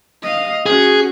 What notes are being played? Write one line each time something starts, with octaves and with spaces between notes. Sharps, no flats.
D#5 F5
C#4 F#4 G#4